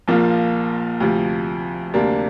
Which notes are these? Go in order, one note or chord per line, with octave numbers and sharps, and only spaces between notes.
A#1 A#2 F3 A#3
D2 C3 F3
D2 C3 A#3 D4